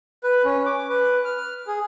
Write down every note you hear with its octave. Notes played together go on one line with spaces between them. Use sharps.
B4
C#4
D6
B4
F6
G#4